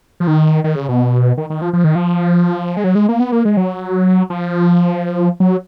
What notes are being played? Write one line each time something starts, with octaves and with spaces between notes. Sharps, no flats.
F3
D#3
D#3
C#3
B2
D#3
D#3
F3
F3
D#3
F3
G#3
F#3
G#3
A#3
B3
A#3
G#3
F#3
F3
F#3